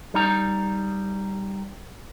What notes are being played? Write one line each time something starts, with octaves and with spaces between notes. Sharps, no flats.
G3 D#4 A#5